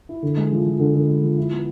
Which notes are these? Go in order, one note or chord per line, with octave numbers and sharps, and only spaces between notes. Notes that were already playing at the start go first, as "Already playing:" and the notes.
E4
D3
G#3
F3
F3
D3
D3
G#3
F3
E4
B3